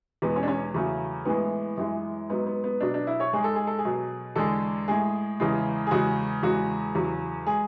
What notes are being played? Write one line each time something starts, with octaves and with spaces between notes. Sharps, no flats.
E2 B2 G#3 B3
C#4
D4
C#4
E2 C#3 F#3 A3
A2 E3 G#3 B3
F#2 E3 G#3
G#2 F#3 B3
B3
B3
B2 F#3 D4
D4
E4
C#5
G#2 G#3 G#4
A4
G#4
A4
G#4
B2 F#3
E2 D3 G#3 A4
A2 G#3 G#4
E2 C#3 E3 G#3
G#4
E2 C#3 G#3 F#4
E2 C#3 G#3 F#4
E2 C#3 F#3
G#3 G#4